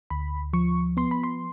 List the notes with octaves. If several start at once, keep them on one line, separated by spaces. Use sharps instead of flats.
D2 B5
F3 C#6
B3 C6
B5
C6